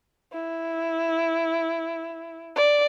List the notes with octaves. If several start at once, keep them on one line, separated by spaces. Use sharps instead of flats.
E4
D5